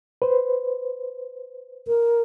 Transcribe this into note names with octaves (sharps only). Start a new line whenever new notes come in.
B4 C5
A#4